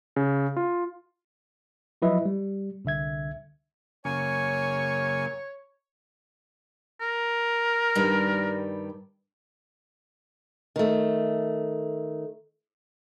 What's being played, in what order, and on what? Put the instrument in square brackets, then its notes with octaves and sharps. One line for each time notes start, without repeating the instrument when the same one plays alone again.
[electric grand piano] C#3
F4
[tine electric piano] F3 F#3 E4 B4 D#5 E5
G3
C2 D3 E5 G#6
[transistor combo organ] F#2 A#3 C#6 [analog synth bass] C#3 [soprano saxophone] C#5 [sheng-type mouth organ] G#5
[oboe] A#4
[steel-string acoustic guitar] G2 D#3 G3
D#3 A3